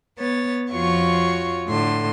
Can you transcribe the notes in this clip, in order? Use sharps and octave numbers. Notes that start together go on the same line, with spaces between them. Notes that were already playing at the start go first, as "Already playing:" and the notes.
B3 C#5 A6
F2 F3 F4 F#4 C#5 C#6
A2 D3 C6